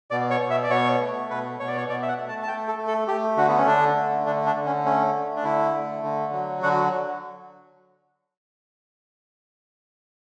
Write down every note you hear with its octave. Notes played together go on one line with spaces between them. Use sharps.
B2 D5
C#5
B2
E5
D5
B2 C#5
A3
B2 B4
B2 C#5
D5
C#5
B2 D5
E5
F#5
A3
A5
A5
A3 G5
A4
A3
A4
A3 G4
D3 F#4
B3
C#4
D3 D4
A3
D3 D4
D4
D3
C#4
A3 C#4
A3
D4
D3 E4
A3
D3
F#3
D3 F#4